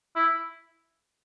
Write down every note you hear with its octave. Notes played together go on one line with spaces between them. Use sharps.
E4